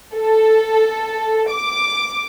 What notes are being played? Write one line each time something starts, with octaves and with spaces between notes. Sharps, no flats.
A4
D6